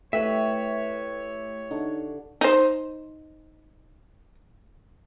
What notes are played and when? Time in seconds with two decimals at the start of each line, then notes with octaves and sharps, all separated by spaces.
0.13 A3 E4 G4 B4 C#5 E5
1.71 D3 D#4
2.41 D#4 C5